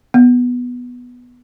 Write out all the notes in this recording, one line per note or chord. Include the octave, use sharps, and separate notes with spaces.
B3